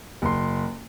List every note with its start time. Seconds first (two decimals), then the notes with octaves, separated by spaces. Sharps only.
0.22 F#1 C6